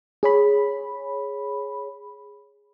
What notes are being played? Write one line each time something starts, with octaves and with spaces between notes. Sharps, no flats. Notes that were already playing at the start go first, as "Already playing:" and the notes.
G#4 C#5 B5